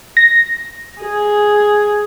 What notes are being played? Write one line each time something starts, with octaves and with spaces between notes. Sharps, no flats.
A#6
G#4